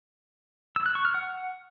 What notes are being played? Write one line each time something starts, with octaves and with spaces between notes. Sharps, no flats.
E6
F#6
C#6
F6
F#5